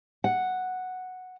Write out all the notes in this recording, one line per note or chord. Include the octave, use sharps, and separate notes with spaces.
F#5